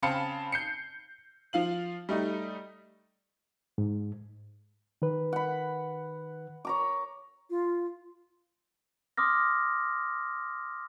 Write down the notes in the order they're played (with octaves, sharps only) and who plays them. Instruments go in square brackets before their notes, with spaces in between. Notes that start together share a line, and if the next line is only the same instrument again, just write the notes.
[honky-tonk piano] C#3 C4 F5 A5 B5 C#7
G6 C7 C#7
F3 F4 F5 F#7
G3 A3 D#4
[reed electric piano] G#2
D#3 B4
[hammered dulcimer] F#5 B5
C#5 A#5 D6
[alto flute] F4
[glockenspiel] C6 D6 D#6 F6 A#6